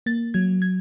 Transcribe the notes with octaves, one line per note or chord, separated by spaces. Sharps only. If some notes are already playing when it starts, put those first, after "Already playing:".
A#3 A6
F#3 G#6
G#6